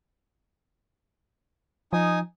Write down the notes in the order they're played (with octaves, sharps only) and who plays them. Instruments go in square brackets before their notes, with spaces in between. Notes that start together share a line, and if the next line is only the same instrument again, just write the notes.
[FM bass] F3 [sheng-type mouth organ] D#4 G#5 D#6